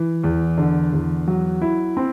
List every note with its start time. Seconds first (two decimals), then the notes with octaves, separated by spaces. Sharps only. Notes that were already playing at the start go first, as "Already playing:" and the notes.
Already playing: E3
0.24 E2
0.58 D3
0.93 E2
1.28 F#3
1.62 E4
1.97 C4